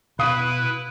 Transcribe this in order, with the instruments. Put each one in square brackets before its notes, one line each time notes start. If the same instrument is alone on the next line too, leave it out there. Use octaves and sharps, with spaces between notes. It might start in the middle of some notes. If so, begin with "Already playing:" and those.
[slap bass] B2 [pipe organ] E4 B4 [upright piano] F5 D#6 F#6